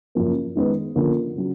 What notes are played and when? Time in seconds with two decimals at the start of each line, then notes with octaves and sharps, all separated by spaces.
0.15 F#2 C#3 F3 A#3
0.55 D#3 G#3 B3
0.95 D3 F3 A#3 C#4 F4
1.36 C#3 F#3